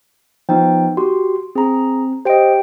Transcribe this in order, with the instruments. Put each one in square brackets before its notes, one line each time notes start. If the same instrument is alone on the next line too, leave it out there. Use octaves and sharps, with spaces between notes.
[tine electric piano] F3 [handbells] B3 D#4 G5
[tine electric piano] F#4 G4 [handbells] C6
[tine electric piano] C4 [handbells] G#4 A#5
[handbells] G4 G5 D7 [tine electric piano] C5 D#5